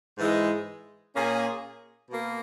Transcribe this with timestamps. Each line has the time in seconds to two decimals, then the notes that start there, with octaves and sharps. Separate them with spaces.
0.18 G#2 E3 G#3
1.14 A#2 A#3 C#4 G#4
2.10 B2 A#3